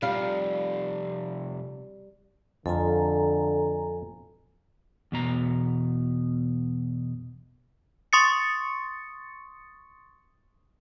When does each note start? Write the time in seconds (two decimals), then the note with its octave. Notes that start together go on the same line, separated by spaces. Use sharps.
0.02 C3 F3 G3 F5
2.66 F2 D3 F4 A4 G#5 A#5
5.12 E2 B2 A#5
8.13 C6 C#6 D#6 A6 C#7